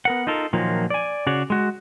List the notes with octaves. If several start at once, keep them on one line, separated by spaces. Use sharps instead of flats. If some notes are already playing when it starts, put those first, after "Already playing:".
B3 A#4 F#5
D#4 F4 A4 A#4
A#2 D#3 F3 F#3 A#3
D5 G#5
C#3 F#4 G#4 C#5 D5
G#3 F#4